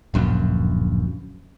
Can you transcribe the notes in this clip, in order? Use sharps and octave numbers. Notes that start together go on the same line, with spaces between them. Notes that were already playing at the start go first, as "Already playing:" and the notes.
D1 A#1 F#2